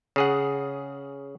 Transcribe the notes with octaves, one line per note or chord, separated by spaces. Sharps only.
C#3 G#4 F#5